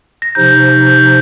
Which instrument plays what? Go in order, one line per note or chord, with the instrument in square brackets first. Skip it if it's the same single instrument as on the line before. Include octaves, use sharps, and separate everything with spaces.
[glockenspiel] A#6
[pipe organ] C3 F3 D#4 [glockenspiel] G6
[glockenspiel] G6